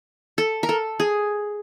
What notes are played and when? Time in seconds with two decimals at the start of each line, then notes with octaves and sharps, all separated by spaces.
0.38 A4
0.63 A#4
0.69 A4
1.00 G#4